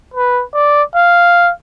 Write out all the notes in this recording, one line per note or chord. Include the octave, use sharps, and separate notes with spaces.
B4
D5
F5